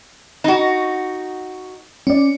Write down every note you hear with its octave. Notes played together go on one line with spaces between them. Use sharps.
D#4 F#4
C#4 D5